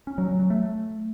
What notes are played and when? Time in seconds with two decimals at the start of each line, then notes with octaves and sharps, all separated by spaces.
0.07 C#4
0.18 F#3
0.29 F#3
0.40 F#3
0.50 A3